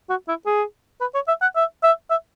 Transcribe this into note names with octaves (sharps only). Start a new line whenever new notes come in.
F#4
E4
G#4
B4
C#5
E5
F#5
E5
E5
E5